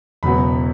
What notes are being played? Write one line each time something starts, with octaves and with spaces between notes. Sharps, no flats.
E1 E2 C#3 F#3 B3 B5